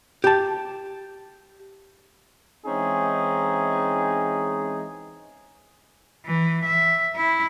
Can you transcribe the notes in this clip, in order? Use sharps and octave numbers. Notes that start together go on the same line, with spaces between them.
G4 A5
E3 G#3 C4 C#4 D#4 G#4
E3
E5
E4